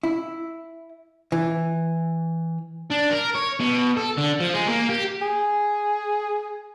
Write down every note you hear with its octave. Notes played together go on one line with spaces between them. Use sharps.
E4
E3
D4
A#4
C#5
B2
A4
D3
F3
G#3
A#3
G4
G#4